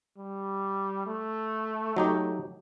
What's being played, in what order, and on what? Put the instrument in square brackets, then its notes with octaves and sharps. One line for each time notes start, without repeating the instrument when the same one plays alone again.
[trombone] G3
A3
[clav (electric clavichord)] F#3 D#4 G4